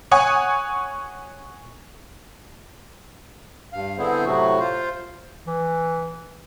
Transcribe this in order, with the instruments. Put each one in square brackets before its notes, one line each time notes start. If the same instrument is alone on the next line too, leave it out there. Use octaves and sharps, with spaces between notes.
[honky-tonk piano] C#5 F#5 G#5 C#6 D#6
[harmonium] G2 F5
D3 B3 C4 E4 G#4 C5
A2 C3 F#3 A3 F#4
F4 C5
[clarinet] E3